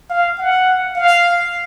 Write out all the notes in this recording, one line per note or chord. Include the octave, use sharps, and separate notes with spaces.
F5
F#5
F5